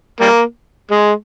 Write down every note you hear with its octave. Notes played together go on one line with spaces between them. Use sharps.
G3 A#3
G#3